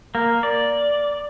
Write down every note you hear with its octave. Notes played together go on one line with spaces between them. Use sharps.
A#3
D5